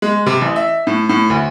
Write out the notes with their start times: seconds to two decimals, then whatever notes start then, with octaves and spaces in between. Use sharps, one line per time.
0.02 G#3
0.26 C3
0.41 A1
0.56 E5
0.87 A2
1.09 A2
1.30 D2